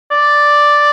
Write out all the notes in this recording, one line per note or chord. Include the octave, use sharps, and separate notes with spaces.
D5